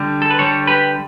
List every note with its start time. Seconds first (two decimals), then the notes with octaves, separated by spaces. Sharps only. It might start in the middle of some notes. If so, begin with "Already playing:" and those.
Already playing: D3 G3
0.22 A4
0.31 B4
0.39 D3 G3 A4 C#5
0.67 G4 B4